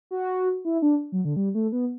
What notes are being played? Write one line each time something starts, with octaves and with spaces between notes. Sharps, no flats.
F#4
E4
D4
F#3
D3
G3
A3
B3